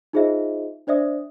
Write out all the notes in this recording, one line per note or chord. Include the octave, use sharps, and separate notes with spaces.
D#4 F4 G#4 C5 D#5 E5
D4 C5 D5 E5 D#6